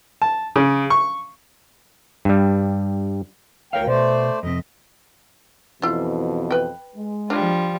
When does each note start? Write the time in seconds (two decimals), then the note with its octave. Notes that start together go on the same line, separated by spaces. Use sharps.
0.22 A5
0.56 C#3
0.90 C#6
2.25 G2 G3
3.73 D2 A#4 C#5 F5 G5
3.87 B2 A3 C5 D5
4.43 F2 C3 D#5
5.82 F2 B2 E3 E4 F4
6.51 B4 G5
6.96 G#3
7.30 F3 G3 D4 F4 A#4